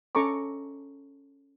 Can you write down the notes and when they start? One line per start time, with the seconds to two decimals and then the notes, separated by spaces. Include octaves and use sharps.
0.15 C#4 A4 A#5 C#6 D6